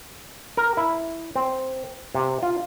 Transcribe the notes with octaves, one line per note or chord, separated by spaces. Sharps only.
A#4
E4
C4
C3
F4